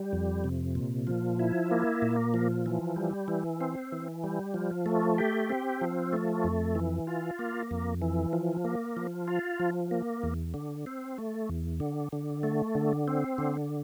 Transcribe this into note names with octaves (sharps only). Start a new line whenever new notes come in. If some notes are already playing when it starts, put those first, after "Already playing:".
Already playing: G3
F2
C3
A#2
F3
E4
A#3
A#2
F3
E3
G3
E3
C4
E3
G3
F3
A3
G4
C4
F3
A3
F2
E3
F4
A#3
F2
E3
F3
A#3
F3
F4
F3
A#3
E2
D3
C4
A3
E2
D3
D3
A3
D3
C4
D3